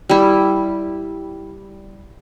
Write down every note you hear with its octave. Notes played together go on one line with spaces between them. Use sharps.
G3 E4